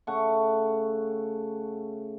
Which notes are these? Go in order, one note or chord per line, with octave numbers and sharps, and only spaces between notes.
C#3 A3 F#5 C#6